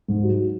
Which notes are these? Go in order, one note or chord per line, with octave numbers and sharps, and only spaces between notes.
G#2
F#3